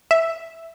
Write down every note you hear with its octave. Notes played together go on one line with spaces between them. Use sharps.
E5